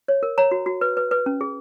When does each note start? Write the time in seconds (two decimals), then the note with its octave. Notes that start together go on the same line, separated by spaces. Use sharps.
0.08 C#5
0.23 A#4
0.38 C#5 A#5
0.51 F#4
0.66 F#4
0.81 B4
0.97 B4
1.11 B4
1.26 C#4
1.41 G#4